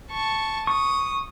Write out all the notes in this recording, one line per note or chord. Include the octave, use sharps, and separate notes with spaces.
A5 C#6
C#6 D#6